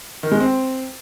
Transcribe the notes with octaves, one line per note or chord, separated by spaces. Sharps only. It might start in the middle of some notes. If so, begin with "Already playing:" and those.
D#3
G#3
C4